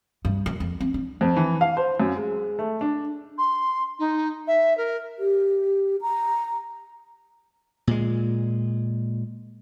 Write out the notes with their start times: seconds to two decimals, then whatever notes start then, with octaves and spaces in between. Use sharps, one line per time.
0.25 G2
0.46 F#2
0.60 F2
0.80 C4
0.94 D4
1.21 F2
1.37 E3
1.61 F5
1.77 C5
2.00 F#2
2.16 G#3
2.59 A3
2.81 D4
3.38 C6
3.99 D#4
4.47 E5
4.77 A#4
5.19 G4
6.02 A#5
7.87 A#2 G#3